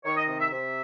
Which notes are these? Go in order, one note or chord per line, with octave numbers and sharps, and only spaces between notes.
D#3 C#5
D#5
C3 D#5
E5
C3 E5